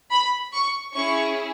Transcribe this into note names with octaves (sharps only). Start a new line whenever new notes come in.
B5
C#6
C#4 E4 G#4 C#6